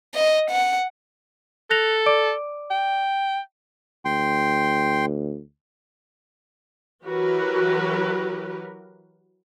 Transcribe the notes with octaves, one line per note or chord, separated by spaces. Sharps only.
D#5
F#5
A4 F#6 A#6 F7
D5 D6 D7
G5
D2 G5 C6
E3 F#3 F#4 G4 A#4 B4